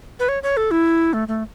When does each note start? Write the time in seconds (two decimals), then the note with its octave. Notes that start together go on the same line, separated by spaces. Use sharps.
0.19 B4
0.29 C#5
0.43 C#5
0.57 A4
0.71 E4
1.13 A3
1.28 A3